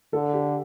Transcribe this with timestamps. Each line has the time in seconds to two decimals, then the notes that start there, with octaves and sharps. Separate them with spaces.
0.13 D3 A4
0.33 G4